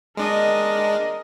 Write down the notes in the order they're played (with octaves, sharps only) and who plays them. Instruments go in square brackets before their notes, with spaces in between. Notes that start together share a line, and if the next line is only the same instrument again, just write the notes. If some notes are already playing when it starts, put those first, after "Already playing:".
[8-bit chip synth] G#3 D4 [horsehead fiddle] A#4 D#5